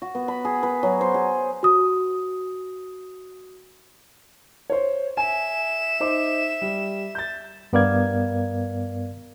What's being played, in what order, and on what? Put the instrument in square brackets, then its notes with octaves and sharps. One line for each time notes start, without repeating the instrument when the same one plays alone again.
[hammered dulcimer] F#4
B3
B5
G#4
B4
F#3
C5
G#4
[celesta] F#4 D#6
[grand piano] C5 C#5
[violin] E5 E7 [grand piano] G#5
[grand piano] D#4 C5 D6
G3
G6 A6
[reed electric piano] G2 B3 A#4 D5 F5 G#6